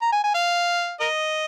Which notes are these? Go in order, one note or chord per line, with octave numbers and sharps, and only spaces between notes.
A#5
G#5
G#5
F5
A#4 D#5